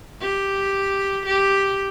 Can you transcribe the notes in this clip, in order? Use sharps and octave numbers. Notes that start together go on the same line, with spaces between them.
G4
G4